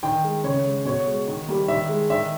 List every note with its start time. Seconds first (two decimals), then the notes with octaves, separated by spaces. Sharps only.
0.03 D#3 G5
0.24 G#3
0.44 C#3 C#5
0.66 G#3
0.85 B2 C#5
1.06 G#3
1.28 D#3
1.49 G3 A#3
1.68 D#3 E5
1.89 G#3
2.10 D#3 E5